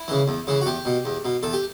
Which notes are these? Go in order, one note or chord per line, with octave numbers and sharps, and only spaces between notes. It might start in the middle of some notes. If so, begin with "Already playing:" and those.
Already playing: E4
C#3 E3
E2
C#3 E3
F#4
E2 G4
B2
E2
B2
E2 A4
G4